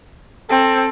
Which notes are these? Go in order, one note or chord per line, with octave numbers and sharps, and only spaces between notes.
C4 A4